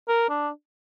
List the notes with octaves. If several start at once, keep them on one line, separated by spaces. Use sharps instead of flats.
A#4
D4